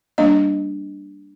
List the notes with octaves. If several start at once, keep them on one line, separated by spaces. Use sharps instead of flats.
G3 A#3 D4 D#5